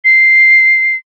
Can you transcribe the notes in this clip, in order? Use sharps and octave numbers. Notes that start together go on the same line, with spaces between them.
C7